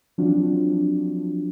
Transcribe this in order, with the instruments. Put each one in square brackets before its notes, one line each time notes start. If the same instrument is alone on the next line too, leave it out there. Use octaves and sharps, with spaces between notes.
[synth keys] F3 F#3 C4 D4 F4 F#4